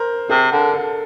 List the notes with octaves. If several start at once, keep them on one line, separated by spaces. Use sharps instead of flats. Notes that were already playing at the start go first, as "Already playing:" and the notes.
Already playing: A#4 C5
C3 G#4
D3 A#4
A4